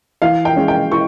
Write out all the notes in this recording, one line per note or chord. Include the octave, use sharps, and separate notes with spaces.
E3 F5
G5
G#3 C#4
G5
E3 C#6